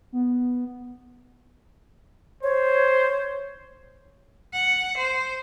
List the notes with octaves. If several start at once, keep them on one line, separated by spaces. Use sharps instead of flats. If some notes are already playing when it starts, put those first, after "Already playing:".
B3
C5 C#5
F#5
C5